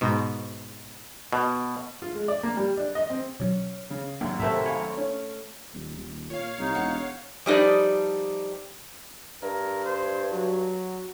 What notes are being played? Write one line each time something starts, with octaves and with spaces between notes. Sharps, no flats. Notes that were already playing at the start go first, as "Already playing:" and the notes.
G#2 B2
B2
F4
G#3
D5
A#3
G3
D4
D#5
C4
B2 F#3 C#4
C#3
G#1 F#2 A#3
A2 C3 A3 A#4 E5
C#5 F5 G#5 B5
C#4
D#1
D#1
A#2 C#5 F5
C2 D#4
E1 F#5
F3 G3 D#4 B4 D5
G2 A#4
C5
F#3 F#4